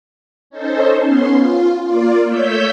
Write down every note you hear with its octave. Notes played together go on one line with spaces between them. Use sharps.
C#4 D#4 A4 C5
B3 C#4 C6
F4
A#3 F4 D5
A3 C#5 E6 G6 B6